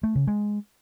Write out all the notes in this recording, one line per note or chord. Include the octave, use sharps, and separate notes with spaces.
A3
C#3
G#3